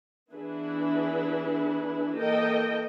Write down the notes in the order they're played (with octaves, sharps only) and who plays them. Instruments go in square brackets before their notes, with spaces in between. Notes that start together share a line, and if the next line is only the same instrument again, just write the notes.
[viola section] E3 B3 D4 E4 G#4 B4
E3 A#3 A4 A#4 D#5 G5